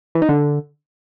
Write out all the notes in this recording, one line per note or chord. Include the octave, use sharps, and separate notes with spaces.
E3
D#4
D3